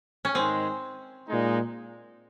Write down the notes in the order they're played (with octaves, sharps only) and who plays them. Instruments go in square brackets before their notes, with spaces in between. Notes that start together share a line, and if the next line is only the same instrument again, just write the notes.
[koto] C#4
[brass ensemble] G#2 D#3 G#3 [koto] C4
[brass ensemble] A#2 G#3 D#4